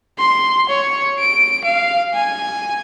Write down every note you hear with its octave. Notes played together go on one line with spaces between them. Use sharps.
C6
C#5
D7
F5
G#5